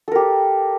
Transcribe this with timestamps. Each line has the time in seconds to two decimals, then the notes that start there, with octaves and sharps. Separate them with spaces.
0.08 A4
0.12 A#4
0.15 G4